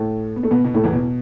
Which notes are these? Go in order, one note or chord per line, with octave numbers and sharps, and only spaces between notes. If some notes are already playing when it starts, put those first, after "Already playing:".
Already playing: A2 A3
B3
A3
B2 B3
B2 B3
A2 A3
E2 E3
B2